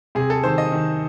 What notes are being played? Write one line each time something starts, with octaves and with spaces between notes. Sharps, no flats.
C3 G#4
A4
D#3 C5
D#5
D#3